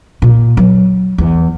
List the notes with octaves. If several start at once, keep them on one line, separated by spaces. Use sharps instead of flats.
A#2
F#3
E2